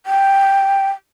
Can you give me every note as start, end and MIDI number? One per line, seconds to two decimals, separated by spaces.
0.06 0.90 79